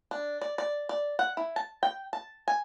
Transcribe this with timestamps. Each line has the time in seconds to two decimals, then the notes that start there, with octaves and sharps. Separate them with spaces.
0.11 D4
0.41 D5
0.58 D5
0.89 D5
1.19 F#5
1.37 E4
1.56 A5
1.83 G5
2.13 A5
2.48 G#5